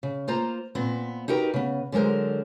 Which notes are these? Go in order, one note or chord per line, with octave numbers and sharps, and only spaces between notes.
C#3
A#3 F4 C5 A#5
A#2 B3 C4
D#4 F#4 G4 A#4 B4
C#3 B3
D3 F#3 G#3 A#4 C5